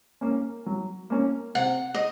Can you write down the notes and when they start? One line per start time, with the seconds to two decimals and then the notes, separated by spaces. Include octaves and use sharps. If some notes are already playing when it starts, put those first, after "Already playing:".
0.21 A#3 C#4
0.66 F#3
1.10 A#3 C#4
1.55 C3 F#5
1.95 D#5